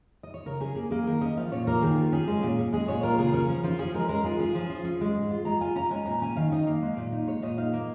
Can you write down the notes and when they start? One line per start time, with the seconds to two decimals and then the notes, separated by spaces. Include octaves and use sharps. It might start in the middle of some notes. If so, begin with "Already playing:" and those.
0.23 D#5
0.34 C#5
0.46 C#3 A#4
0.61 C#4 G#4
0.75 A#3 G#4
0.91 A#3 G#4
1.07 D#3 A#4
1.21 C#4 D#5
1.37 F3 F5
1.52 A#2 C#5
1.67 A#3 A#4
1.82 D#3 G#4
1.97 F4
2.12 C#4 G#4
2.28 G#3
2.43 A#2
2.58 C#4
2.72 G#3 G#4
2.88 A#2 C#5
3.03 F4 A#4
3.19 C#3 G#4
3.33 C#4 A#4
3.48 F3
3.64 F3 F4
3.79 C#4 G#4
3.94 G#3 A#4
4.09 G#3 A#4
4.24 F4 G#4
4.39 C#4 G#4
4.55 F3
4.70 F4
4.85 C#4
5.01 G#3
5.15 G#2
5.31 F4
5.45 G#3 A#5
5.61 F4 G#5
5.76 C#4 A#5
5.91 G#3 G#5
6.06 A#2 A#5
6.22 C#4 G#5
6.36 D#3 F5
6.51 D#4 D#5
6.67 A#3 F5
6.82 G#3
6.97 A#2
7.12 D#4
7.27 G#3 C#5
7.42 A#2 D#5
7.58 D#4 F5
7.73 A#3